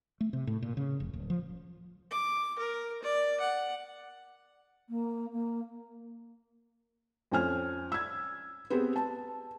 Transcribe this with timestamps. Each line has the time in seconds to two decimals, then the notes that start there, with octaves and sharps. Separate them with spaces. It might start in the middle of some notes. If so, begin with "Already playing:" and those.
0.21 A3
0.33 C3
0.47 A2
0.62 A#2
0.77 C#3
1.00 F1
1.13 D1
1.30 F3
2.11 D6
2.59 A#4
3.03 D5
3.40 F#5
4.89 A#3
5.32 A#3
7.32 F2 C#4 G#5 F6
7.92 E6 G#6
8.70 B3 C4 G4 G#4 B4
8.96 A5